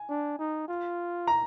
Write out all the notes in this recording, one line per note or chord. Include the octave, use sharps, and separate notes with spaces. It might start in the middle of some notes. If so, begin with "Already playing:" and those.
Already playing: G#5
D4
D#4
F4
A#5